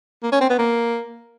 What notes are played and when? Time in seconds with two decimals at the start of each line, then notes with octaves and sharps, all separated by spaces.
0.23 A#3
0.32 C#4
0.41 C4
0.50 B3
0.58 A#3